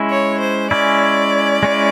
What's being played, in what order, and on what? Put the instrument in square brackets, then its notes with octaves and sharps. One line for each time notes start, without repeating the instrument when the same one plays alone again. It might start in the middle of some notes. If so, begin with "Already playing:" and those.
Already playing: [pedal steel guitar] G#3 C#4 E4
[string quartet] C#5
C5
[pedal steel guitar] G#3 C#4 E4 [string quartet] D5
[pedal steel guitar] G#3 C#4 E4